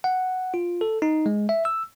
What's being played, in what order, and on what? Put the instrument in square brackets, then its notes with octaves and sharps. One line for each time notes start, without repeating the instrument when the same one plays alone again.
[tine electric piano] F#5
F4
A4
D#4
G#3
E5
E6